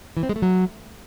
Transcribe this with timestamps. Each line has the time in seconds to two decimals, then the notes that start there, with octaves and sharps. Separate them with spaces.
0.17 E3
0.23 C4
0.29 G#3
0.36 A3
0.42 F#3